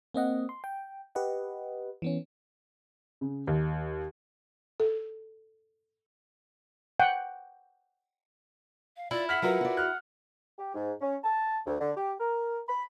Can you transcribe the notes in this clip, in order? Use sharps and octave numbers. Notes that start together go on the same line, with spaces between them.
A#3 C4 D#5 F#5
C6
G5
G4 B4 D#5 F#5
E3 B3 C#4
C#3
D#2
A4
F#5 G5
F5
E4 F4 D5
F#5 F6 B6 F#7
F#3 F4 A#4 B4 F#5
F#4 D5
F6 F#6
G4
G#2
C#4
A5
D2
D3
G4
A#4
B5